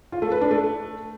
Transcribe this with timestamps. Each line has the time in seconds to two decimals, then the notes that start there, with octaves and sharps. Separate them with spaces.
0.12 F4
0.22 A3
0.32 B4
0.41 D4
0.51 A3